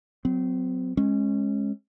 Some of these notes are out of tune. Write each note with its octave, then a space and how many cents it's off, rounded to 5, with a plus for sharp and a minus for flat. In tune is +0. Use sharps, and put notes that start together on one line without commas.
F#3 +0 C4 -35
G#3 +0 C#4 -25